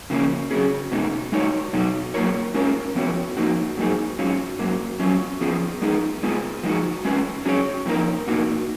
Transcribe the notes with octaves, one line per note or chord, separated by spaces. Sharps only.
C#3 F3 A#3 C#4
C#3 F#3 C#4 G#4
B2 G#3 B3 D#4
G#3 D#4 F#4 C#5
B2 F#3 B3 D#4 F#4
F#3 A#3 F4 A#4 C#5
G#3 C#4 F4 A#4 C#5
F3 B3 F#4 C#5
G#2 F3 A#3 D#4 F#4
G#2 F#3 A#3 D#4 G#4
G#2 F#3 C#4 F4
G#2 F#3 A#3
F#3 C#4 F4
F3 B3 F4 G#4
G#3 B3 D#4 G#4
G#3 B3 F4 G#4
F3 G#3 D#4 F#4
G#3 C#4 F4 B4
F#3 C#4 G#4 C#5
F2 F3 A#3 D#4 A#4
B2 A#3 D#4 F#4